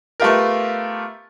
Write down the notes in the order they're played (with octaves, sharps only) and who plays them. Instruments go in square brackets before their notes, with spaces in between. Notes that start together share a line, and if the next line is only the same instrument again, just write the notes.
[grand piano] A3 B3 F4 G4 A#4